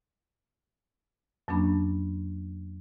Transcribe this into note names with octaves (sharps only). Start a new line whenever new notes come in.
F2 F#3 A#3 C#4 D4 B5